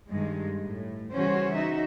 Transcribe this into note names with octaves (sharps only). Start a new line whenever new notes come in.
G2 D#3 G#3
A2
C#3 E3 G3 C#4 F#4 C5
D#4 F#4 E5